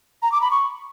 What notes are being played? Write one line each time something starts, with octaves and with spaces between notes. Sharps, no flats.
A#5
D6
B5
C#6